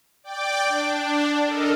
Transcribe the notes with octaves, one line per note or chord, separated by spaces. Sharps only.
D5 G5 D6
D4
A4 A#4 D#5